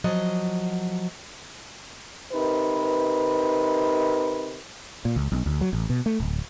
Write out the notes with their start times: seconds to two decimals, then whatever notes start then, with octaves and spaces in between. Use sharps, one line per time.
0.04 F3 F#3 D#5
2.33 C3 D#4 A#4 B4
5.05 A#2
5.16 C#2
5.32 B1
5.46 D2
5.61 F#3
5.73 A1
5.90 B2
6.06 A3
6.20 D1